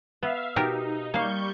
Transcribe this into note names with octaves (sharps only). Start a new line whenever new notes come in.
B3 E5 F5
B2 D#4 G4 A#4
G3 A#3 F5 C#6 G6